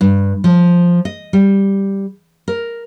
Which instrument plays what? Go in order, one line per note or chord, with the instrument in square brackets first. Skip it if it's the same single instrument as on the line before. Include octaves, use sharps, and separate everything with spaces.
[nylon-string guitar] G2
F3
D#5
G3
A#4